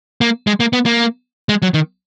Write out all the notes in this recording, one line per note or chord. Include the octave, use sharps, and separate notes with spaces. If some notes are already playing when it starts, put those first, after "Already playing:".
A#3
G#3
A#3
B3
A#3
G#3
F#3
D#3